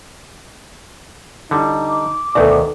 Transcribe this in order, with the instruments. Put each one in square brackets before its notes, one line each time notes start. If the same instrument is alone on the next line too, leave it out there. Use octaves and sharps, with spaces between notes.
[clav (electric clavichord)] D3 G3 [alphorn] D#4 [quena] E4
[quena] D6
[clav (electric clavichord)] D2 B2 [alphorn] D#3 [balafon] A4 B4 D5